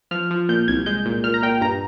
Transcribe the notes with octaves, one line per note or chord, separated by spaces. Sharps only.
F3 F6
F3
A#2 G6
C2 G#6
G#3 G6
A#2
A#2 F6
A#5
A#2 G5
G2 A#5